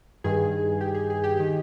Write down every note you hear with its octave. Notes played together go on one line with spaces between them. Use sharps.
G2 D#3 G#4
G4
G#4
G#4
G4
D#3 G4